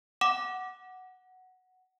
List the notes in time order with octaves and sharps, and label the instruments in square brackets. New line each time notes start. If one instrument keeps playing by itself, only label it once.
[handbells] F#5 [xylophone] D6 E7